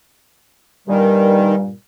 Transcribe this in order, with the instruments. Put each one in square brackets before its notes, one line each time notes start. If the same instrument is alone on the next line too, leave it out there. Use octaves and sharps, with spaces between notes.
[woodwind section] G2 A#2 G3 [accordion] D#3